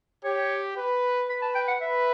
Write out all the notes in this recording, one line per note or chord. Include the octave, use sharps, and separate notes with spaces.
G4 C#5
B4
B4 B5
A5
G5
F#5
B4 E5